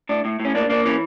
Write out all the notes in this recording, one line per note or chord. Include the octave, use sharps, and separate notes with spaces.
A2 D4
A2
A2
C#4
A#3 D4
A#3 D4
E3 C#4